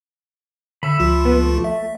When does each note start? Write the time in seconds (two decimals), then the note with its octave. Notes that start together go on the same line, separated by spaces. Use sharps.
0.83 D3 E5 B5
1.00 C#2 F3 F4
1.25 B3
1.39 A3
1.64 E5